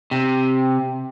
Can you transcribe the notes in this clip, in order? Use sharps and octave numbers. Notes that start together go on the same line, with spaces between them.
C3